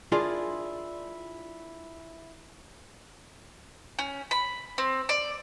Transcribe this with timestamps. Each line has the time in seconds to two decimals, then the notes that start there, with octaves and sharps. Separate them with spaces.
0.12 D4 E4 F4 G#4 A#4 D5
3.99 C#4
4.31 B5
4.78 C4
5.09 D5